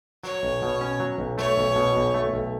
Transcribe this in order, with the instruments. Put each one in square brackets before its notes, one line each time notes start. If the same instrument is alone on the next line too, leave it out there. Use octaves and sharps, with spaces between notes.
[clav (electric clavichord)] F#3 [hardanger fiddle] C#5
[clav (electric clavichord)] B1
B2
C#4
F#3
B1
[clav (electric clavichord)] A3 [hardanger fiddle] C#5
[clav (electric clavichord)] B1
B2
B1
A3
B1